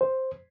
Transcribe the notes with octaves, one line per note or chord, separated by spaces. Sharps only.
C5